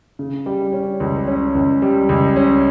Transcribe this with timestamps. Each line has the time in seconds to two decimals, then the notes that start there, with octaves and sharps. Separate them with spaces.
0.19 C#3
0.46 G3
0.73 C#4
1.00 C#2
1.27 C#4
1.55 C#2
1.82 G3
2.09 C#2
2.36 C#4